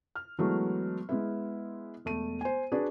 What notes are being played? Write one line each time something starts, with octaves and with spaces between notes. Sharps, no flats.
F6
E3 F#3 G#3 A3 B3
G#3 B3 E4
E1 A3 D#7
C5 G#5
D4 F#4 G#4 B4 D5